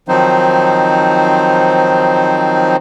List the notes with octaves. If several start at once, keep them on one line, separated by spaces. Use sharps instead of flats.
D#3 F3 F#3 C4 D#4 C5